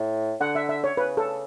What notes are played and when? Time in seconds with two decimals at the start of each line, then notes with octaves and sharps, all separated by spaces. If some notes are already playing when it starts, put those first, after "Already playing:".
Already playing: A2
0.40 D3 F#5
0.55 E5
0.69 E5
0.84 C#5
0.97 C#3 B4
1.17 A4